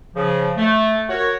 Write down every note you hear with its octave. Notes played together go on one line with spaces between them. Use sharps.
C#3 F3
A3
F#4 A#4 C#5